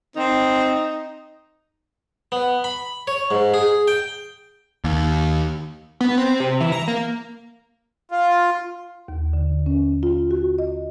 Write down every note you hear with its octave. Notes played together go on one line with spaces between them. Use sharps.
C4 D#4
B3
B5
C#5
G#2
G#4
G5
D#2
B3
C4
C3
E3
A#5
A#3
F4
D#2
D3
C#4
F4
F#4
D#5